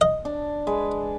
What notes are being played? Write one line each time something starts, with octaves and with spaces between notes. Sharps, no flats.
D#5
D4
G#3 B4